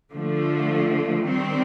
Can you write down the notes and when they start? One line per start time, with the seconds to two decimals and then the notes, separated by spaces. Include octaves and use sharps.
0.11 D3 F3 A3
1.23 D#3 G3 C4